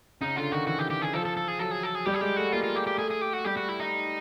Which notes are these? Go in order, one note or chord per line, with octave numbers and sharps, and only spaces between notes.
C#3 D#4
D3 F4
D#3 F#4
E3 F#4
G4
G4
G#4
F3 A4
A4
A4
G#4
F#3 A4
G#4
A4
G#4
G3 G4
G#4
G#3 G4
A3 F#4
A#3 F4
F4
G4
G4
A3 G#4
G#4
G4
F#4
G3 G4
F#4
E4
D#4